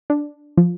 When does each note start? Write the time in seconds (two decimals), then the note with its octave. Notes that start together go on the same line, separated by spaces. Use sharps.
0.10 D4
0.57 F3